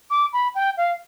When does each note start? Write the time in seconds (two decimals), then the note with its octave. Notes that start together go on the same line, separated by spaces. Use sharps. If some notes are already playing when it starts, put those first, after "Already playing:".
0.10 D6
0.33 B5
0.55 G5
0.77 F5